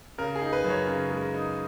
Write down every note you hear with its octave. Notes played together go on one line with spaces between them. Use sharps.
C#3 A#4
G#4
D#4
B4
F#2
C#5
C#3
G#3
D#4